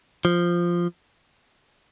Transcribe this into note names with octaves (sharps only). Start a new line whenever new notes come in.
F3